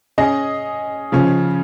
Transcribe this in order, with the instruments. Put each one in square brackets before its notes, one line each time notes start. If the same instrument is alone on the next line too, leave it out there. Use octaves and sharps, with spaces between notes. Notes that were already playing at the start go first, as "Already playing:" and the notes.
[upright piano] C#4 G#4 D#5
C#3 F3 C#4